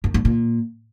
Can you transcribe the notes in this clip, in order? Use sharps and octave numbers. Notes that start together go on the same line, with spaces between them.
F#2
G2
A#2